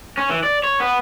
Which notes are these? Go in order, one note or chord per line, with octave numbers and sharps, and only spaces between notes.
C#4
E3
D5
C#5
B3